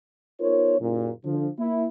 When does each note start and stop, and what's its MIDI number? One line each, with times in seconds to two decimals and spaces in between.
0.40 0.77 59
0.40 0.77 63
0.40 0.77 65
0.40 0.77 70
0.40 0.77 72
0.40 0.77 73
0.79 1.10 30
0.79 1.10 46
1.25 1.49 50
1.25 1.49 53
1.59 1.86 58
1.59 1.86 64